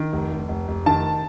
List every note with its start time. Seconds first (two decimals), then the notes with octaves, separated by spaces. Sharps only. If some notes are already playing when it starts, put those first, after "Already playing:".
Already playing: D#3
0.12 F1
0.31 F1
0.48 F1
0.68 F1
0.86 D#3 A5